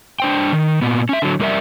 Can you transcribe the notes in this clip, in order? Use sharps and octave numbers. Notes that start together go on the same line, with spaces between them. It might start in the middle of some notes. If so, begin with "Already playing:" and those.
D4 C5 G5
D#3
A#2 B3
C#4 E5
D3 F#3
F2 G3 A#4 D5 E5